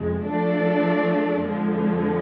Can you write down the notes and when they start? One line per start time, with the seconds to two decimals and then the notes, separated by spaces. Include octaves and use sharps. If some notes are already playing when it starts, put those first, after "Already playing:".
Already playing: F2 C3 G#3
0.26 F3 A3 D4 A4 D5
1.44 F2 D3 F3 G#3